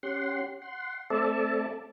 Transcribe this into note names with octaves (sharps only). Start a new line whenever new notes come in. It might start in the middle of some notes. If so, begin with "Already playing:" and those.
C#4 G4 F#5 C6
F#5 C6
A3 C4 A4 D5 E5 A5